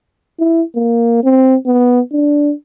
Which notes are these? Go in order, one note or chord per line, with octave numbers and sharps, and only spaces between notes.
E4
A#3
C4
B3
D4